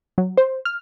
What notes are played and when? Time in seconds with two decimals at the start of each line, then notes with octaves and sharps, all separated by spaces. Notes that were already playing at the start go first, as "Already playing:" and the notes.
0.18 F#3
0.37 C5
0.65 F6